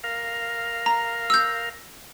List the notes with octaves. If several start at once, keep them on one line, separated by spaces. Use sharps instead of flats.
A#4 F5
A#5
E6 G6